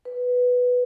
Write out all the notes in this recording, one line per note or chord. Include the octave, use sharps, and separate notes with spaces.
B4